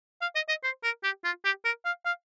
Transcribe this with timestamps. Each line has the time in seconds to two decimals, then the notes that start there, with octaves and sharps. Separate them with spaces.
0.22 F5
0.35 D#5
0.49 D#5
0.63 C5
0.83 A#4
1.04 G4
1.24 F4
1.45 G4
1.65 A#4
1.85 F5
2.05 F5